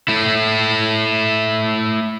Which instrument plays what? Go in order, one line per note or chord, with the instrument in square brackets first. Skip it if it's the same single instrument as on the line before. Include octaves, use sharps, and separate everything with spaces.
[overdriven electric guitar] A3 E4